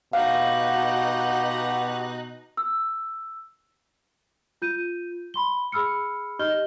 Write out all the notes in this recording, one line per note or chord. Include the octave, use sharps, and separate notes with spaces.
B2 D#4 G4 F5 F#5 F#6
E6
F4 G6 D#7
B5 C6 G7
G#4 B5 E6 F6 C#7
D#4 G4 D#5 F6 G6 G7